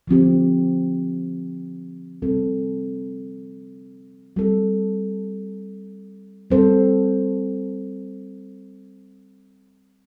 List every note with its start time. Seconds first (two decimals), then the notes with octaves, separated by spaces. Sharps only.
0.07 D3 F3 C4 G4
2.22 C3 G3 C4 A4
4.36 G3 C4 A4
6.50 G3 C4 A4 C5